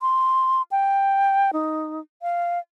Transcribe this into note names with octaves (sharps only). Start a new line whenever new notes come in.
C6
G5
D#4
F5